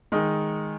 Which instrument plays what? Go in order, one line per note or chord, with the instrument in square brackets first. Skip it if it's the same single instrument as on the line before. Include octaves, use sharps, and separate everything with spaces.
[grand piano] D#3 G#3 D#4